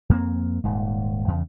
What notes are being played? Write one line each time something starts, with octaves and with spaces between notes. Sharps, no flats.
F2 A#3 C4
D#1 G#2
E2 C#3